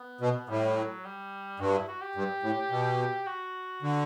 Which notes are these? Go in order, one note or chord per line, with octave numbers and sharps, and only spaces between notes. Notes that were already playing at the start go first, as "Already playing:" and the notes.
Already playing: B3
B2
A2 G3
G3
F#3
G3
G2 F#4
E4
F#4
G4
G2
A2
B2
F#4
D3